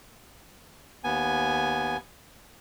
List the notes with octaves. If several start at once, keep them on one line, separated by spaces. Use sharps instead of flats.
D#2 B3 G#5